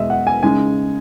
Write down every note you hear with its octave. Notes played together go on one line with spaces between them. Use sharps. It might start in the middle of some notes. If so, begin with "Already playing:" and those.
Already playing: E2 B2 G#3 D#5 E5
F#5
G#5
C#3 G#3 D#4 G#5